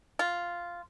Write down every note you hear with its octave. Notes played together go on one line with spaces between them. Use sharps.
F4